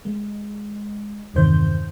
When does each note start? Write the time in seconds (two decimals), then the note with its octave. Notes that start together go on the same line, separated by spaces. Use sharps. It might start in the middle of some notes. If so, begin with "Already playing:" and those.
0.05 G#3
1.34 E2 G2 C3 D#3 C5 G6